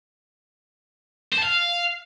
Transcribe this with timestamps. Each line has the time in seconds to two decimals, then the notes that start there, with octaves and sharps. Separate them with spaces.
1.33 C5
1.38 A5
1.43 F5